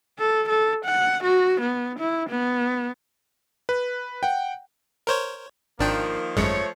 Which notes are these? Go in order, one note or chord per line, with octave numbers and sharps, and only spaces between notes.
A4
A4
F#5
F#4
B3
E4
B3
B4
F#5 G5
A#4 C5 C#5
G#1 D#3 F3 A#3 D4 G5
G#1 F#2 F3 G#3 A3 C#5